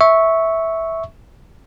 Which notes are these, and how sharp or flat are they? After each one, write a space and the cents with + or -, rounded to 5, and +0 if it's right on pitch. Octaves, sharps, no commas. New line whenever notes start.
E5 -10 C#6 +0